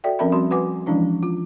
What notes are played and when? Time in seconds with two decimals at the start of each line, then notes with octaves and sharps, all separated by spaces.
0.04 F#4 A4 D5 E5 G5
0.19 F3 C4 C#4 A#4 E5 B5
0.32 G3 C4 F#4 B5 C6
0.51 F#4 B4 F#5 G#5 D6
0.86 E3 F3 G#3 C#4 D4 E4
1.23 F4